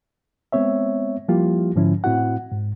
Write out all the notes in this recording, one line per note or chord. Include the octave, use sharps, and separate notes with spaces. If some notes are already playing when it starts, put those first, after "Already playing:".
G#3 B3 C4 C#5 E5
F3 G3 A#3 E4 F4 G4
G#2 D3 F3 C#4 E4
A2 C4 E4 F#4 F#5
G#2